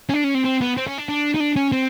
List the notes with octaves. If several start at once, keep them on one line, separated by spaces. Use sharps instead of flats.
C#4
D4
C#4
C4
C4
B3
C4
C#4
D4
D4
D#4
D4
C#4
C4